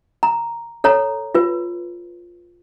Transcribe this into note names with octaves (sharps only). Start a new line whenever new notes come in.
A#5
A4 C#5 A#5
F4 B4